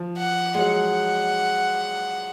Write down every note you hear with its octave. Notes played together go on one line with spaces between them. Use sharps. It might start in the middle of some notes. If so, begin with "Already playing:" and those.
Already playing: F3
F#5
G#3
F#3 F#5